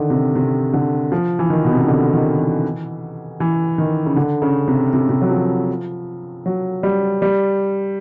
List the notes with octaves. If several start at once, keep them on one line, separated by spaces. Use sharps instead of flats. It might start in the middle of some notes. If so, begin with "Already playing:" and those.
Already playing: D3 D#3
C3
C3
D3
F3
E3
D#3
B2
C3
C#3
D3
D#3
E3
E3
D#3
C#3
D3
C#3
C3
C3
C#3
C3
F#3
F3
F#3
G3
G3